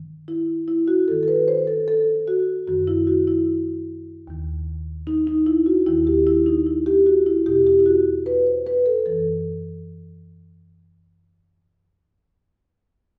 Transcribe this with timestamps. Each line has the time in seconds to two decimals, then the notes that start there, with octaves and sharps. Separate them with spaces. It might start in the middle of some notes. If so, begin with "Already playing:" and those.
Already playing: G2 D#3
0.28 E4
0.68 E4
0.88 F#4
1.08 G2 A4
1.12 D#3
1.23 A4
1.28 B4
1.48 C5
1.67 A4
1.88 A4
2.28 F#4
2.67 F#2 D#3 F#4
2.87 E4
3.07 F#4
3.27 E4
4.27 D#2 D#3
5.07 D#4
5.27 D#4
5.46 E4
5.66 F#4
5.86 D#2 D#3 E4
6.07 G4
6.27 E4
6.46 D#4
6.66 E4
6.86 G4
7.06 F#4
7.26 E4
7.46 E2 B2 G4
7.67 G4
7.80 E4
7.86 F#4
8.26 B4
8.46 C5
8.67 B4
8.86 A4
9.06 F#2 E3 A4